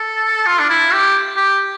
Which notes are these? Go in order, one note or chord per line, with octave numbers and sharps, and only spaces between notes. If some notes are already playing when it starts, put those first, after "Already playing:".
Already playing: A4
F4
D4
E4
G4
G4